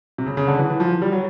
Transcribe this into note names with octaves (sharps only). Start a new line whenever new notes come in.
C3
C#3
C#3
D3
E3
E3
F3
G3
F#3